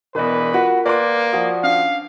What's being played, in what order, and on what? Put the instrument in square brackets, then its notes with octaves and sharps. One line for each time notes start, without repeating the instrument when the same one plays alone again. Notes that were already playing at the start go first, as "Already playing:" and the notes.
[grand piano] E1 E2 [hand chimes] A#4 D5 D#5 [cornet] B4
[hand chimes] F4 A#4 [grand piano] F#4
[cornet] A#3 [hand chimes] B4 G5 F#6 [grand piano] D5 C6 D6
[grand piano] F3 F#4 [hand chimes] D5 D#6
[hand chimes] C#4 D4 [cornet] F5